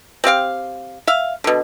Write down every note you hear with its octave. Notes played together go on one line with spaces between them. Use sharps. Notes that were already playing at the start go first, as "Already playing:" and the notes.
C4 G4 F5 G5
E5 F5
B2 D3